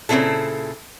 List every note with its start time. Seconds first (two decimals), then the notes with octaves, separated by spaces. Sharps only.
0.09 A#2 C#3 A3 C4 E4 A4